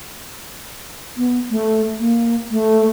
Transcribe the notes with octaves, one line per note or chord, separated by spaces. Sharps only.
B3
A3
A#3
A3